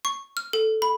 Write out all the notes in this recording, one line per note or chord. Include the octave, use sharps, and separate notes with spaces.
C#6
F6
A4
B5